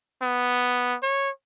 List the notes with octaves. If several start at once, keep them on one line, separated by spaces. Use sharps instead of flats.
B3
C#5